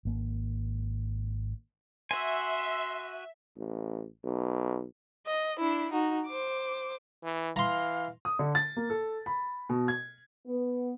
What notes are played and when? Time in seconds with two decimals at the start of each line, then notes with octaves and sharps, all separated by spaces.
0.05 G#1 A#3
2.11 F#4 E5 G#5 C6
3.57 A1
4.24 B1
5.27 D#5
5.59 D4 E4
5.91 D#4 F#4
6.27 C5 D6
7.23 E3
7.56 E3 F5 A#5 C6
8.25 D#6
8.39 D3
8.55 A6
8.77 A#3
8.90 A4
9.26 B5
9.70 B2
9.88 G#6
10.47 B3